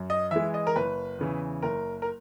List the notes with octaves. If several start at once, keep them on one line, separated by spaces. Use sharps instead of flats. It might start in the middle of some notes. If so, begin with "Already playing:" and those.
Already playing: F#2
D#5
E3 G#3 E5
D#5
A#4
F#1 B4
E2 C#3 E3
F#1 A#4
A#4